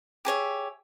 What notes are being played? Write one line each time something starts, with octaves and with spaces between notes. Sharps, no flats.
G4 G#4 C#5 E5